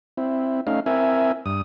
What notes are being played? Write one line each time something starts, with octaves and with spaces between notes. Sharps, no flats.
C4 E4
A3 C#4 D#4 F5
C4 E4 A#4 E5 G#5
G2 D#6